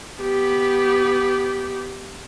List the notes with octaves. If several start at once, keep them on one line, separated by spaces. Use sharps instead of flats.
B3 G4